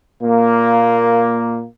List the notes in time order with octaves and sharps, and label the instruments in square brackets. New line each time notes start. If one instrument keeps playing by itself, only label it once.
[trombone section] A#2 A#3